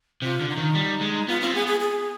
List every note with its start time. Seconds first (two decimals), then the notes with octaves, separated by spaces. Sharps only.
0.22 C3 F4
0.41 D3
0.49 D#4
0.57 D#3
0.75 G3
1.01 G#3
1.28 B3 F4
1.41 C4 F4
1.54 B3 G#4
1.67 G#4
1.80 G#4